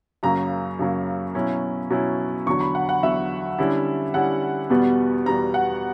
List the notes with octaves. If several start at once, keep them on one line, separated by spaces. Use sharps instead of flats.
F#2 C#3 F#3 A#3 A#5
F#2 C#3 F#3 A#3
B2 F#3 C#4 E4
B2 F#3 C#4 E4
E2 D3 F#3 C#6
B5
F#5
F#5
E2 D3 F#3 E5
D3 G3 C#4 E4
D3 G3 C#4 E4 F#5
E2 B2 G3 B3
E2 B2 G3 B3 A#5
F#5